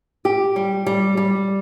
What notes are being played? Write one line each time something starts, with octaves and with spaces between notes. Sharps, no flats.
G4
G3
G3
G3